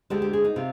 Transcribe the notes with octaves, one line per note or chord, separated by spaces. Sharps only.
D2 D3 G#3 D4 G4
G4
G#4
D#4
C3 F4